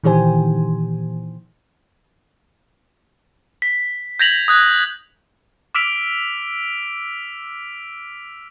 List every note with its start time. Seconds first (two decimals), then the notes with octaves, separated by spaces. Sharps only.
0.03 A#2 D#3 E3 G4 C5 G#5
3.62 B6
4.19 G6 G#6 A#6 B6 F7 F#7
4.48 D#6 F#6 G#6
5.75 D6 E6 F6 B6 D7 F7